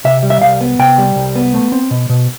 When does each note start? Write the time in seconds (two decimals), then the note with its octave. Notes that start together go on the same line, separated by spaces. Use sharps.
0.05 C3 E5
0.23 G3
0.30 E5
0.42 C2 F5
0.61 B3
0.79 C3 G5
0.98 G3
1.16 C2
1.36 B3
1.54 A3
1.72 C4
1.91 B2
2.09 B2